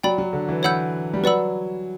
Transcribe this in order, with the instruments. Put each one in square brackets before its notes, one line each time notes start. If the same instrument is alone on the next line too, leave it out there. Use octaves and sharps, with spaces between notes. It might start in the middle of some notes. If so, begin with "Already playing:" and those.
[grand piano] F#3 [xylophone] D5 G5 B5
[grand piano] F#3
D3
E3
[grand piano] E3 [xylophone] C#5 F#5 B5 E6 G6
[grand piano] G3
[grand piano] F#3 [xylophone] B4 D5 F#5 B5 E6